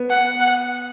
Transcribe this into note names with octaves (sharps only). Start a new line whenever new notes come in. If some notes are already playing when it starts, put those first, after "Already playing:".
Already playing: B3
F#5
F#5